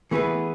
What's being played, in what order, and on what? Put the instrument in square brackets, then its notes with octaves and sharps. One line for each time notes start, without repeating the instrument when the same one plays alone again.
[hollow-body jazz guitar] E3 A3 E4 G#4 B4 [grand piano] B3